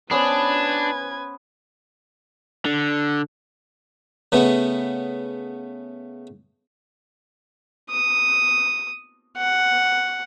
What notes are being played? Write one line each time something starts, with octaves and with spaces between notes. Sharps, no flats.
B3 C#4 D4 B4 C5 G#6
D3
C#3 A3 B3
D#6
F#5